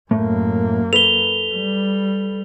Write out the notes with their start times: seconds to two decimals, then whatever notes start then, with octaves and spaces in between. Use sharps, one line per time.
0.11 F#2 A2 A3 A#3
0.93 A4 B4 F7 G7
1.53 G3